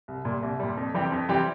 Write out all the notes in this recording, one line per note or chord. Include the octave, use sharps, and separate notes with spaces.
C2
A#2 G3
C2
A#2 G3
F2
E3 G3 C4 G4
F2
E3 G3 C4 G4